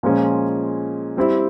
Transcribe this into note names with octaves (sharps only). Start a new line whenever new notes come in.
A#2 F3 G#3 C#4
G3 C4 E4